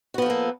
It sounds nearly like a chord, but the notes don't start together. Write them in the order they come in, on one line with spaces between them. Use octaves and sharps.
F#4 B3 F3 A4 A#3